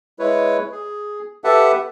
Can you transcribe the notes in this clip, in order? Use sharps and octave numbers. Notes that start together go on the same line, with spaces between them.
G#3 E4 B4 C#5
G#4
G4 A4 B4 E5 F#5 A5